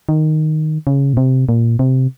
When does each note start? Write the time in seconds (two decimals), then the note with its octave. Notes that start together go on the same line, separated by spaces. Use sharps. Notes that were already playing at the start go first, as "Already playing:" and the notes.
0.09 D#3
0.87 C#3
1.13 A#2
1.17 C3
1.49 A#2
1.79 C3